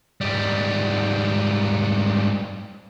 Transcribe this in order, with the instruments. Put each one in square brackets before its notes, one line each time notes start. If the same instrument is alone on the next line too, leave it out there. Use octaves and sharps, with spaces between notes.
[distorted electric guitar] G#2 G3